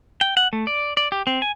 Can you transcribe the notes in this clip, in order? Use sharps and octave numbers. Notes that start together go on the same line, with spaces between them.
G5
F#5
A3
D5
D5
G4
C4
G#5